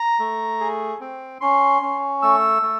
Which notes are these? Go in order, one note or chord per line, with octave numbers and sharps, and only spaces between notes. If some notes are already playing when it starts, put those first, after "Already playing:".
Already playing: A#5
A3
G#4
C4
C#4 C6
C#4
A3 E6
A3